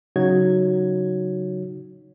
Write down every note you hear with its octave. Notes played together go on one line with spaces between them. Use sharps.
C#3 F#3 D#4 F#4 C#5 G#6